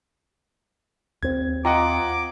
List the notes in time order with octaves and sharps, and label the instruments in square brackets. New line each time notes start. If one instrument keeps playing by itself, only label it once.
[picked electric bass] D#2 C4 [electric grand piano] G#6
[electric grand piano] F4 D#5 F#5 [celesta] G5 A#5 [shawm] D6